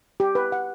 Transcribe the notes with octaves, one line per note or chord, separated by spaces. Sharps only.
G4
B4
F#5